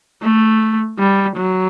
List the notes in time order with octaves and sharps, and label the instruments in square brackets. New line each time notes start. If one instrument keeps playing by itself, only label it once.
[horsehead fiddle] A3
G3
F#3